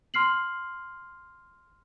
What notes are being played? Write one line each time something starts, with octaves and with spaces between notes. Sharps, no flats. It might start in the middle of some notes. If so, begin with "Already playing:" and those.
C6 F6 C7 F#7